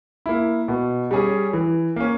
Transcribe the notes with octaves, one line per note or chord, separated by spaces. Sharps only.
A#3 E4
B2
G3 C#4 G#4
E3
A#3 C#4